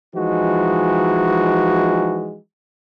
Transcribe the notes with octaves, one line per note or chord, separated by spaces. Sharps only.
E3 F3 G#3 D#4 F#4